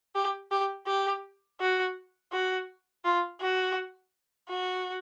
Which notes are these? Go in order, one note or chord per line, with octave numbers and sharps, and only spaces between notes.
G4
G4
G4
F#4
F#4
F4
F#4
F#4